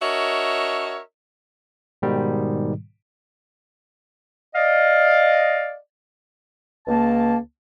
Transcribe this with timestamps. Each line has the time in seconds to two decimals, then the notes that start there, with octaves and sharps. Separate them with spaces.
0.02 D4 F#4 A#4 C#5 D#5 E5
2.02 G#2 B2 D#3 G3
4.55 D5 D#5 F5
6.88 C#2 A#3 A5